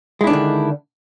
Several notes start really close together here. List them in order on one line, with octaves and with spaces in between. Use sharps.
G#3 E4 D4 D#3 D3